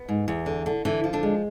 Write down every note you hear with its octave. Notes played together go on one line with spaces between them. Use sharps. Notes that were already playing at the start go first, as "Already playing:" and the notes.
Already playing: B3
G#2
E2
D3
D3
D3 E3 E4
F3
D3 D4
G#3